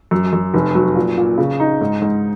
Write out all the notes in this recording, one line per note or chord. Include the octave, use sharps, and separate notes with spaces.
F#2
F#2
F1
F#3
A#2
A#2
C#3
D#4
G#2
G#2